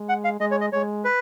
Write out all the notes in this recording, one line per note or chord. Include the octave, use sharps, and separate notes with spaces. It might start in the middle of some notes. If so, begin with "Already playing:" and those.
Already playing: G#3
F#5
F5
G#3 D#5
C#5
D#5
G#3 C#5
B4